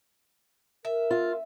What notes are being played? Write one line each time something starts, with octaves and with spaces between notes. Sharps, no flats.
A#4 E5
F4